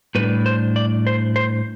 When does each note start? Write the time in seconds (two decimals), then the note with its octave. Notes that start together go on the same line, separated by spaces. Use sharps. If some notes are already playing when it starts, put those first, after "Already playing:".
0.15 A2 G3 D4 B4
0.46 C5
0.76 D5
1.07 C5
1.36 C5